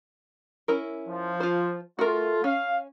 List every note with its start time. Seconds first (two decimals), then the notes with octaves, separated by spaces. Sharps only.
0.68 C#4 E4 A#4
1.07 F3
1.40 F4 C5
1.99 A3 F4 F#4 A#4
2.44 C#4 F5